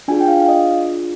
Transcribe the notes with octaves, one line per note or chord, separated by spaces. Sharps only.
D4 F4 G#4 G#5
G5
F5
F5
D#5